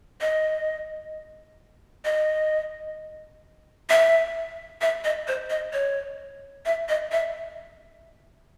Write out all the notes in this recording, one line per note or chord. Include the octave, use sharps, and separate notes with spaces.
D#5
D#5
E5
E5
D#5
C5
D#5
C#5
E5
D#5
E5